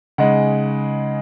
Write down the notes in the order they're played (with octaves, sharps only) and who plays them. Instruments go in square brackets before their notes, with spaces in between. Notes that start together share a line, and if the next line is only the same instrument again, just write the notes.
[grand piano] C#3 G#3 D#4 F#5